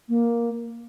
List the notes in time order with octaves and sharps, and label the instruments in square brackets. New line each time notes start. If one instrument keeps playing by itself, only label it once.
[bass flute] A#3